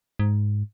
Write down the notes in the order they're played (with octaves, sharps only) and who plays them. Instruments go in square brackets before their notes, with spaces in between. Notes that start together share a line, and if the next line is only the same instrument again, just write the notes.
[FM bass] G#2